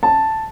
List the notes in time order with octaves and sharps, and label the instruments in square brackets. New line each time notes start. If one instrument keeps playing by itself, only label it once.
[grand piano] A5